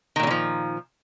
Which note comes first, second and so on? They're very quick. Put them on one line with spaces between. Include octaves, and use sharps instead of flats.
D#3 A#2 F#3 D3 F3